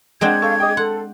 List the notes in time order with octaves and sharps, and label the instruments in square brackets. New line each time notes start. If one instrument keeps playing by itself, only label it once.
[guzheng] G#3 C4 D4 [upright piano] F#5 G6 D7 [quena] G#6
[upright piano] A4 C#6 [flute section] F5
[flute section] G#4 D6 D#6 [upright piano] D#5 G5
[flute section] A4 [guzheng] F#5 [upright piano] C6